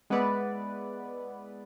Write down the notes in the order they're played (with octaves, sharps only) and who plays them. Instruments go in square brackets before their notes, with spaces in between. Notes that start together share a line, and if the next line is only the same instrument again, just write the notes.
[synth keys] G#3 B3 E4 B4 D5